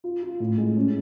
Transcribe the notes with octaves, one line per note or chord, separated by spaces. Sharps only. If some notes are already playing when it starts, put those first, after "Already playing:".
F4
F4
A2
G#3
C#4